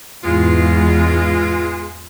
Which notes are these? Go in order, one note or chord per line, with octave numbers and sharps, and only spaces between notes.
E2 G#2 G#3 B3 F4